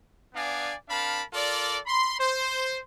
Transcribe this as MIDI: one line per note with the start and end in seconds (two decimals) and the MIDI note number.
0.35 0.74 59
0.35 0.74 62
0.35 0.74 74
0.35 0.74 77
0.35 0.74 80
0.89 1.22 60
0.89 1.22 62
0.89 1.22 70
0.89 1.22 77
0.89 1.22 81
0.89 1.22 83
1.33 1.78 65
1.33 1.78 69
1.33 1.78 70
1.33 1.78 74
1.86 2.14 83
1.86 2.14 84
2.19 2.79 72